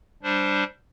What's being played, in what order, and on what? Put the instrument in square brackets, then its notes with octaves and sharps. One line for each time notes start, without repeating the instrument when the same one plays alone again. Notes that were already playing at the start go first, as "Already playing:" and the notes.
[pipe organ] G3 D4 C5